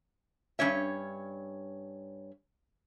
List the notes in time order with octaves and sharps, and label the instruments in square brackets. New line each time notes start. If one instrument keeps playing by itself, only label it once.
[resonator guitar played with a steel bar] G2 G#3 C#4 C#5 E5